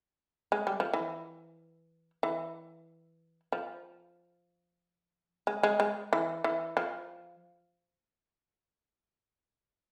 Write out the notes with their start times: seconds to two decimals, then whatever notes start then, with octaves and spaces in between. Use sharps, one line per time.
0.52 G#3
0.67 G3
0.80 F3
0.93 E3
2.23 E3
3.52 F3
5.47 G#3
5.63 G#3
5.80 G#3
6.13 E3
6.44 E3
6.77 F3